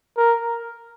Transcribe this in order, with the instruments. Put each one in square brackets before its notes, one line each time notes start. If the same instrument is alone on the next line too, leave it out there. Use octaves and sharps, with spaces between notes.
[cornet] A#4